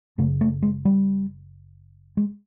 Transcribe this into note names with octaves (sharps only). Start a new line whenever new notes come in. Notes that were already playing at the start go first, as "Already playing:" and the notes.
F#1 F#2 C#3 A3
A3
G#3
G3
G#3